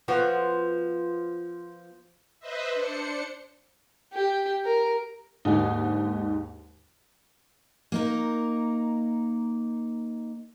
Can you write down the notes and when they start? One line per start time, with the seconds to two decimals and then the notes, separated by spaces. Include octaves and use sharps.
0.08 F3 B3 F#4
2.40 B4 C5 D#5 E5
2.74 D4 C5 C#7
4.13 G4
4.65 A#4
5.45 D#2 G#2 D3 D#4
7.92 A#3 D#4 A#4